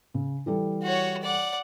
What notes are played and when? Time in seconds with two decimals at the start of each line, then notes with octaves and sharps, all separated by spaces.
0.14 C#3
0.46 E3 G3 A4
0.83 F#4 C#5
1.23 D5 F#5